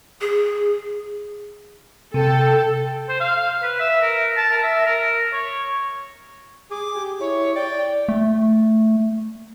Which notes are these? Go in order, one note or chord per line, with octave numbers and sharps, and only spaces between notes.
G#4
C3 A4 G5
C5
F5
B4
E5
A#4
A5
A#4
E5
A#4
C#5
G#4 D6
G4
E4 C#5
D5 G5
A3